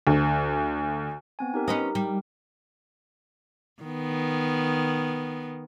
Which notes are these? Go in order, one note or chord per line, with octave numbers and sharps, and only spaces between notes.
D2
B3 C4 G#5
D#4 G4 A#4
C#4 B4 D#5
G3
D#3 B3